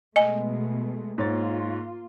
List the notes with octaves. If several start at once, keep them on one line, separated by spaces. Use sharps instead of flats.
B2 G#3 A3 D#5 G#5
G#2 A#3 F4 C#5 A6